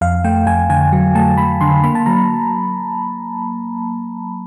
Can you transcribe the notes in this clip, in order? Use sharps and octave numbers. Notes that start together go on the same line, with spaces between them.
F2 F5
A3 G5
F2 G#5
D3 G#5
F#3
A3 A5
A3 B5
D3 C6
A#3 B5
A5
F#3 A#5